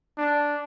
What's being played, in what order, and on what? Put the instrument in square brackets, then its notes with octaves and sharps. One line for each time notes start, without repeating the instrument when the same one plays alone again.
[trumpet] D4